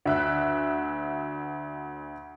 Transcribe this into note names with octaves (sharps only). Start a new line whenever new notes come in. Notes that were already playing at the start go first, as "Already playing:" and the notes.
D2 E5 F#6